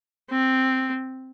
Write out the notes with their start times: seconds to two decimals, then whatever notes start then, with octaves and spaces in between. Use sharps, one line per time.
0.30 C4